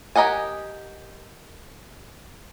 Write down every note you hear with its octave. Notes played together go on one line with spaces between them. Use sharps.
G4 A#4 D#5 F#5 G#5